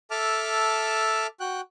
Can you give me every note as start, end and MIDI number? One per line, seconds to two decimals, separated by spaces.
0.11 1.27 69
0.11 1.27 76
0.11 1.27 81
0.11 1.27 86
0.11 1.27 89
1.40 1.61 66
1.40 1.61 79
1.40 1.61 90